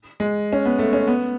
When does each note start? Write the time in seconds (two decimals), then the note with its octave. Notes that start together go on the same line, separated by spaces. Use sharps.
0.20 G#3
0.52 C#4
0.65 B3
0.79 A3
0.93 C#4
1.07 B3